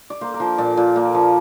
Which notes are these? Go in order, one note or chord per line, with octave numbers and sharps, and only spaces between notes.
D5
A#3 C5
A#4
F3 C5
A#2 D5
A#2
A#3
F3